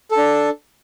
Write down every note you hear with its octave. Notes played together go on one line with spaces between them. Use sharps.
A4
D4